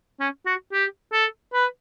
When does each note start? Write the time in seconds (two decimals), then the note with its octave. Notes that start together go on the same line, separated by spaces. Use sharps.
0.20 C#4
0.46 F#4
0.72 G4
1.13 A4
1.54 B4